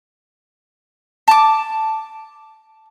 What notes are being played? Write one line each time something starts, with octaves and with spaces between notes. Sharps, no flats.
A5 D6